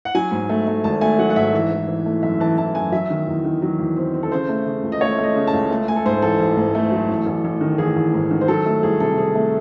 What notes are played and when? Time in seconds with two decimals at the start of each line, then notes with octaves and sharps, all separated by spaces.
0.05 F#5
0.15 F#3 G#5
0.31 G#2
0.49 A3
0.67 A3
0.84 G#1 A5
1.01 A3 G#5
1.19 F#3 F#5
1.30 F#5
1.36 G#2 E5
1.54 E3
1.71 E3
1.88 E3
2.06 A3
2.23 F#2 E5
2.40 E3 A5
2.58 E3 A5
2.75 F#2 G#5
2.92 F#3 E5
3.10 D#3
3.27 E2
3.45 D#3
3.62 F#3
3.79 E2
3.96 C4
4.14 C4
4.23 A4
4.32 C#3 C5
4.49 A3
4.66 C#3
4.83 C#2
4.92 D#5
5.01 A3 C#5
5.18 A3
5.24 D#5
5.36 C#3
5.47 A5
5.53 C#2
5.70 A3
5.88 A3 G#5
5.96 A4
6.06 G#2 C5
6.22 A1 A4
6.40 A1
6.57 G#2
6.75 A3
6.92 F#3
7.09 A1
7.26 A1
7.45 A1
7.61 D#3
7.78 A1 G#4
7.96 A1
8.14 G#2
8.31 D#3
8.41 C5
8.48 F#3 A4
8.66 A3
8.83 C2 G#4
9.00 C3 A4
9.18 C3 G#4
9.35 A3